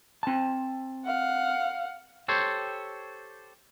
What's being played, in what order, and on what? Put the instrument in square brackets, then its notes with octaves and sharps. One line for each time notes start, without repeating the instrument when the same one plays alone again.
[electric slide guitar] C4 A5
[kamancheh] F5 F#5
[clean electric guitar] G4 A4 C5 C#5